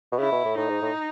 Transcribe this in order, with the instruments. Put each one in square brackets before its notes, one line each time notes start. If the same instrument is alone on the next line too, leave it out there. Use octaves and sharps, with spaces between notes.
[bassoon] B2
[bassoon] C#3 [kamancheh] E4
[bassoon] B2
A2
[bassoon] A2 [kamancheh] D#4
[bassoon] G#2
A2